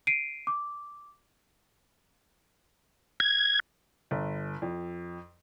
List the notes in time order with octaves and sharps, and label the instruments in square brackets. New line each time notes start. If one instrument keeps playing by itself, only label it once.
[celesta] C7 D7 D#7
D6
[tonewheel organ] G#6
[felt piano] G1
F2